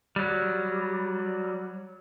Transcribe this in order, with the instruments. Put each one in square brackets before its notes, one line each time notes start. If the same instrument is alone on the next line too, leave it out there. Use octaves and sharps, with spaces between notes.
[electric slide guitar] F#3 G3